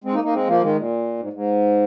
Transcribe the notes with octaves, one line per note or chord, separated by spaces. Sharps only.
G#3 C4
A#3 D#4
A#3 D#4
G#3 C4
F3 A#3
D#3 G#3
A#2
G#2
G#2